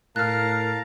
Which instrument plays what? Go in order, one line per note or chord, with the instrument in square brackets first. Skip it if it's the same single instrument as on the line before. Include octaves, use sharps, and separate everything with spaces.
[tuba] A2 [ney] A#4 [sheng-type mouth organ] F5 A5 A#5 [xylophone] F6 F#6